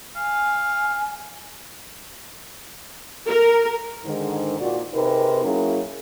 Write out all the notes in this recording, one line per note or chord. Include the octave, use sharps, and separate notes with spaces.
F5 G#5
A#4
G#2 D3 D#3
A#2 F#4 D5
C3 C4 D#4 G#4 A#4 B4
F#3 A#3 C#4 E4 F#4 G#4